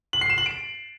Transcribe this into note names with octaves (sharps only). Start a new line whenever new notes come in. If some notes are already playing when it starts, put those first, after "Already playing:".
F#7
C7
E7
F#7
D7